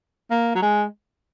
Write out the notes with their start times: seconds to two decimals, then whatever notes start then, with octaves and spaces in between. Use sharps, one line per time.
0.31 A#3
0.55 F#3
0.62 G#3